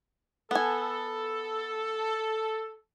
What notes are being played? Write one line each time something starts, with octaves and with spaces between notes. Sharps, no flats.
B3 A4 G#5